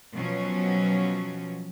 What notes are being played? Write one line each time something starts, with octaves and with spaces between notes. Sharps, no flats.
B2 F3 F#3 C#4